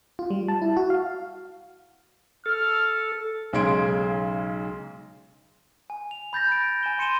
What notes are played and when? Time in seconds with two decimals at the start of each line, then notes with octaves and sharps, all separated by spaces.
0.19 F4
0.30 G3
0.48 A5
0.62 E4
0.77 F#4
0.90 F5
2.46 A4 F6
3.53 B1 C#3 G#3 C6 G#6 D7
5.90 G#5
6.11 F7
6.33 B5 G6 A6 A#6
6.52 D7
6.83 G#5 E7 G7
6.98 B5 C6 C#7 D#7 E7 G7